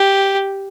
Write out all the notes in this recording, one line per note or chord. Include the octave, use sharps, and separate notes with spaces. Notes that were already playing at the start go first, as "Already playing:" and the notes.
Already playing: G4